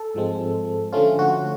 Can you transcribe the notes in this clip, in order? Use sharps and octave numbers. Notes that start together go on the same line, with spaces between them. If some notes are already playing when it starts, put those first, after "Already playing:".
Already playing: A4
G#2 F3 G#3 C4
D3 F3 A3 C#4 F4
F#4